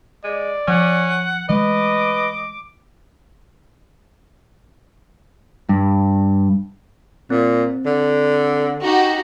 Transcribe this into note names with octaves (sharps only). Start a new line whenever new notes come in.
G#3 D5
F3 C#4 F#5
E3 G#3 A3 B4 D#5 D6
G2
A#2 C4
D3
D#4 F#4 G4